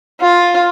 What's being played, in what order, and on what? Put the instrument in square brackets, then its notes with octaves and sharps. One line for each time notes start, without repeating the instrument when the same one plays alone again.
[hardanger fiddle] F4